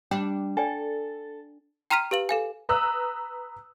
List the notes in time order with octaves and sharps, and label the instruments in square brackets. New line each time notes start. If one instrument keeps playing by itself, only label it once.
[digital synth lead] G3 [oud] D4 [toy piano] G5
[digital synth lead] A4 [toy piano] D5 G5 G#5
[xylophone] G5 A#5 C6 F6 B6 D#7
G4 B4 F5 F#7
A4 F5 G#5
[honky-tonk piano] B4 A#5 D#6 E6 F#6